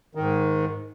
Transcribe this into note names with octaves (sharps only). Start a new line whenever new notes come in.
G#2 D#3